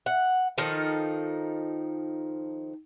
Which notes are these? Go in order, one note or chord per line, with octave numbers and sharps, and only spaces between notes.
F#5
D#3 F3 D#4 A4